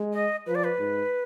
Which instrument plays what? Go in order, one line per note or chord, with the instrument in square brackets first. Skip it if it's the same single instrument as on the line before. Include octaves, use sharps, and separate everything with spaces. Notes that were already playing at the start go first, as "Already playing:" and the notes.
Already playing: [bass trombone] G#3
[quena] D#5
[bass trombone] F3 [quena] B4
[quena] D5
B4
[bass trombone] G#2